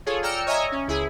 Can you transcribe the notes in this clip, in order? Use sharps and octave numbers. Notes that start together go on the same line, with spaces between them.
F4 G#4 A4 C#5
D5 G5 A#5 E6 F6 C#7
C#5 D#5 E5 G#5 A#5
C#4
C#2 E4 G#4